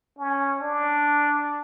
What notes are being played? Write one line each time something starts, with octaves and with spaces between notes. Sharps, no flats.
C#4
D4